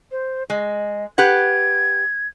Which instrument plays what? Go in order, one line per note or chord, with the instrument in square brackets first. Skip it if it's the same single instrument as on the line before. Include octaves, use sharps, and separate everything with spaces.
[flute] C5
[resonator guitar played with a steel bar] G#3 [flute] D#5
[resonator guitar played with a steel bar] G4 B4 F#5 [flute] G#6